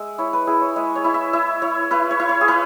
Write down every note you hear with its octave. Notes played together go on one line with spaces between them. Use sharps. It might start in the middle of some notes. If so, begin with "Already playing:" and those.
Already playing: G#3 E5
E4 C#5
B4
E4 G#4
C#5
G#3 E5
C#5
E4
E5
E4 E5
E4 C#5
E4 B4
C#5
E4
C#5
G#4
E4 B4